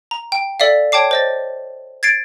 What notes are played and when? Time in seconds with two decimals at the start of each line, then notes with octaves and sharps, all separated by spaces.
0.11 A#5
0.32 G5
0.60 A4 D5 E5 F5
0.92 C#5 G5 A5 D6 C7
1.11 C5 D#5 A6
2.03 G#6 A6 C7 D7